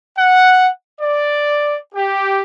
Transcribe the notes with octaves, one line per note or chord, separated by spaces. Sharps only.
F#5
D5
G4